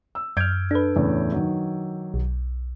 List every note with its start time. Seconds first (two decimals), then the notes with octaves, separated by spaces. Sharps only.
0.15 E6
0.37 F#2 F6 G6 G#6 D7
0.71 D4 A4 B4
0.96 E2 A2 C#3
1.32 D#3 F#3
2.14 B1